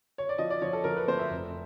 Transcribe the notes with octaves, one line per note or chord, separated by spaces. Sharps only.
C#5
D5
F3 D#5
D5
F3 C#5
A4
F3 A#4
B4
A3 C5
E5
F1